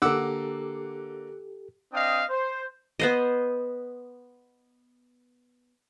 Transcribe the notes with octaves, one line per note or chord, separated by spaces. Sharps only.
D3 A#3 G4 A4 F#5 D6 E6
C4 D4 D#5 F5 G5 D#6
C5
B3 C5 D#5